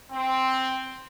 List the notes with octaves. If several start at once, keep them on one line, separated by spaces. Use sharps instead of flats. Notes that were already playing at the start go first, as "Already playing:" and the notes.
C4